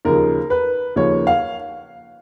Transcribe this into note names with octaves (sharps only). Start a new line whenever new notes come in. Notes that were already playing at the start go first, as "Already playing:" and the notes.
D#2 C#3 F3 A#3 A#4
B4
D#2 C#3 F3 A#3 C#5
F5